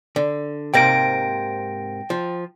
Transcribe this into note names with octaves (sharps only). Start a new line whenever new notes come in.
D3
G#2 C3 A#3 G5 A#6 D7
F3